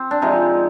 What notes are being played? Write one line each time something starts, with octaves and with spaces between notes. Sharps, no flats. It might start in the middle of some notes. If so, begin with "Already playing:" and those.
Already playing: C4
D4
C3 F3 G#3 D#4